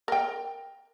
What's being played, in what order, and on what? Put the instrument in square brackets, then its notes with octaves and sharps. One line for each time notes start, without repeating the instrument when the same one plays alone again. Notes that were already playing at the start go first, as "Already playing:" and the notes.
[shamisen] A#4 G5